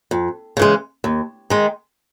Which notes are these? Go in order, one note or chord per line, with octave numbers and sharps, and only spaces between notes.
F2
C#3 E3 G#3
D#2
D#3 G#3